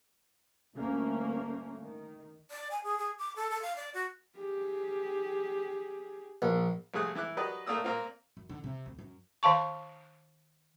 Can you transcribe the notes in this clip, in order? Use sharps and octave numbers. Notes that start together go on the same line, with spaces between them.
G1 D2 A3 A#3 C#4
D#3
D5
G#5
G#4
G#4
D6
A4
A4
F5
D5
F#4
G4 G#4
A#1
A#1 C3 A3 G#4 D#6 F#6
E3 E4 D6 F#6
F#3 G4 B4 D5 D#5
A2 A3 A#3 D5 D#6 E6
A#2 A#3 C4 F4
F#2
D3
C3
D2
F#2
D#3 F5 A5 C#6